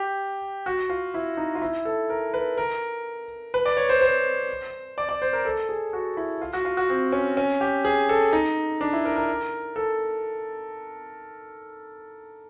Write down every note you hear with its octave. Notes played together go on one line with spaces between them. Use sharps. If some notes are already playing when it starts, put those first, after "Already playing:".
Already playing: G4
F#4
F4
E4
D#4
F4
E4
A4
A#4
B4
A#4
B4
D5
C#5
C5
C5
D5
D5
C5
A#4
A4
G#4
F#4
E4
F4
F#4
F4
F#4
C4
C#4
C#4
G4
G#4
A4
D#4
D4
E4
A#4
A#4
A4